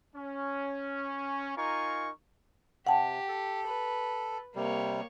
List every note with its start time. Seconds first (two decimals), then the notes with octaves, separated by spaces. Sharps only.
0.16 C#4
1.57 D#4 F4 A#4 G#5 C#6
2.87 C3 G4 F#5 G5 A5
3.28 A4
3.67 B4
4.56 C3 G3 A#3 C#5